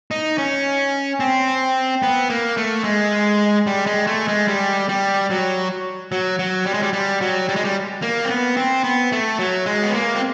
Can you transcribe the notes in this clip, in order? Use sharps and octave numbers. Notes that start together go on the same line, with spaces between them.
D#4
C#4
C4
B3
A#3
A3
G#3
G3
G#3
A3
G#3
G3
G3
F#3
F#3
F#3
G3
G#3
G3
G3
F#3
G3
G#3
G3
A#3
C4
B3
C4
B3
A3
F#3
G#3
B3
A#3
C4